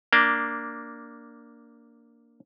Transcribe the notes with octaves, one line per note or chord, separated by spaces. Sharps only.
A#3 D4